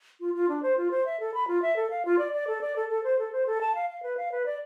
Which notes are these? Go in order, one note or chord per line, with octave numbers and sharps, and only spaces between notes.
F4
F4
D4
C5
F4
C5
E5
A4
B5
F4
E5
A4
F5
F4
D5
D5
A4
D5
A4
A4
C5
A4
C5
A4
A5
F5
F5
B4
F5
B4
D5